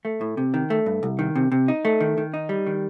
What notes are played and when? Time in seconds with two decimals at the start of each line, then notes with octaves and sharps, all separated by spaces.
0.05 A3
0.21 A2
0.37 C3
0.54 D#3
0.70 A3
0.86 G2
1.03 C2
1.19 D#3
1.35 C3
1.52 C3
1.68 D#4
1.85 A3
2.01 D#3
2.18 D#3
2.34 D#4
2.49 G3
2.67 D#3